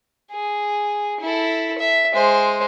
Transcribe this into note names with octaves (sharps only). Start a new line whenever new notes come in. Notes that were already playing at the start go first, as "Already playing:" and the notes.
G#4
E4 A4
E5
G#3 C5